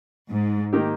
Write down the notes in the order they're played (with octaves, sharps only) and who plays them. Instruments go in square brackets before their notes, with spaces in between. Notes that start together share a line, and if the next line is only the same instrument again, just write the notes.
[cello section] G#2
[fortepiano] D#3 A#3 D#4 G4